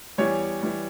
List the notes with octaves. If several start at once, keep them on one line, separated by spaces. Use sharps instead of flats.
E2 E3 G3 C#5
E3 G3